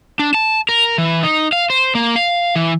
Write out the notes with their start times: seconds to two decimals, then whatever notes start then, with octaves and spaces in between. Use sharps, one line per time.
0.19 D4
0.34 A5
0.69 A#4
0.98 E3
1.23 D#4
1.53 F5
1.70 C5
1.95 A#3
2.16 F5
2.55 E3